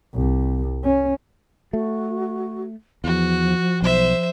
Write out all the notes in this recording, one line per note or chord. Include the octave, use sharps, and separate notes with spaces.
C2
C#4
A3 F#4
E2 F3 F#4
B1 C5 E5